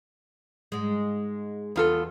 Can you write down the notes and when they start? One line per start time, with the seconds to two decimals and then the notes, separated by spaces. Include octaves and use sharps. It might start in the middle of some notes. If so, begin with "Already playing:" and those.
0.72 G#2 G#3
1.76 E2 B3 F4 A4